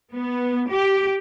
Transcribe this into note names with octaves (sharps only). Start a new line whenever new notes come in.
B3
G4